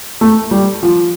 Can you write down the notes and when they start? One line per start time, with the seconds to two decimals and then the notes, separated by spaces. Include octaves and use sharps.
0.21 A3
0.51 G3
0.83 F3